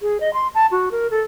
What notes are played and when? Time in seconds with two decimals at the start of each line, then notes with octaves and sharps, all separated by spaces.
0.02 G#4
0.20 D#5
0.34 C6
0.55 A5
0.71 F#4
0.91 A#4
1.11 A4